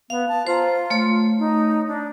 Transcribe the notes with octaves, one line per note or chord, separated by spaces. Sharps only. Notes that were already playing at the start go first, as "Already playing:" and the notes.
B3 F5
A5
F4 C5 A#5
A3 C#5
D#4
D4